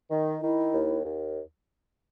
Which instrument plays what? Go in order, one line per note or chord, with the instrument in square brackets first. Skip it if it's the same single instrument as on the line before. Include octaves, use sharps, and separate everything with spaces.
[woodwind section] D#3
[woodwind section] D#3 [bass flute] E4
[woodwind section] D#2
D#2